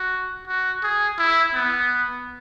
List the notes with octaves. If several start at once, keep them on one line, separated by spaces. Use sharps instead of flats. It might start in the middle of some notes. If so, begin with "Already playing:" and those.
Already playing: F#4
F#4
G#4
E4
B3